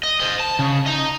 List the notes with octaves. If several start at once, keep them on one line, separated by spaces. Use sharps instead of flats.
D#5
C5 D#5
A5
C#3
D#5 A#5